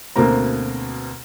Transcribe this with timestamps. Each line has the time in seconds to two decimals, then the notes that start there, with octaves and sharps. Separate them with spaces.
0.16 D2 B2 A#3 C4 A#5